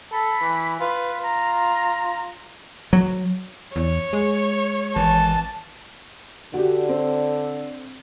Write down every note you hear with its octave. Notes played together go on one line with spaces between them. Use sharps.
A4 B5
E3
F4 B4
A#5
F#3
E2 C#5
G#3
G#1 E3 A5
D3 F#4 G4
C4